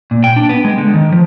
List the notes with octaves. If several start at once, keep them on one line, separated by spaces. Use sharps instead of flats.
A#2
G5
D4
B3
G#3
D3
D#3
F3